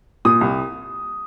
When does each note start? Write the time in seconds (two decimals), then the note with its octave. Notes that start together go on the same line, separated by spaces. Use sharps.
0.25 A#2 D#6
0.41 C2